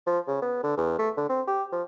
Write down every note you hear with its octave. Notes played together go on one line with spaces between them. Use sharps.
F3
C#3
B3
D3
E2
A3
D3
C4
G4
F3